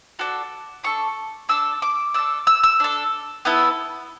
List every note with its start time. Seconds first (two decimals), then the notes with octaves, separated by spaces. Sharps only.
0.19 D4 F#4 A4
0.84 D4 A4 C#6
1.49 D4 A4 E6
1.82 D6
2.14 D4 A4 E6
2.47 E6
2.64 E6
2.80 D4 A4
3.45 B3 E4 A4